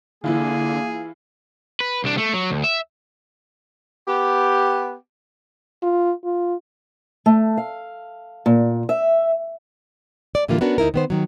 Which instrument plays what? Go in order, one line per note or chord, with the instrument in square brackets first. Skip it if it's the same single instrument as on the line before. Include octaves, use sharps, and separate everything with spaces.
[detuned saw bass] D3 [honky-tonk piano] E3 E4 F4 [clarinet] A#3 [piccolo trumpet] G#4
[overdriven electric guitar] B4
C2 D4
A3
F#3
D2
E5
[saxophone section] B3 G4
[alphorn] F4
F4
[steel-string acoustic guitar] A3
F5
A#2
E5
[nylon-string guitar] D5
A2 D3 E3 G3 A#3 F4
B3 C#4 D4 F#4 A#4
D2 D#4 E4 A#4
D#3 B3 C5
D#3 F#3